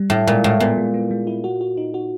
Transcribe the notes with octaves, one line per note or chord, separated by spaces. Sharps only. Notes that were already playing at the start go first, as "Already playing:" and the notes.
Already playing: G3
A2 E4
A#2 G#3
A2 G#3
A#2 B3
G#3
B3
G#3
E4
F#4
F#4
D#4
F#4